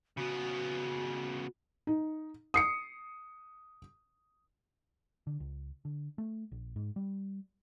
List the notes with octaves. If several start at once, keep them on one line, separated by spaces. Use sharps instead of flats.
C#3 B3 F#4
D#4
D#6 C7 C#7
D3
C#2
D3
A3
A#1
G#2
G3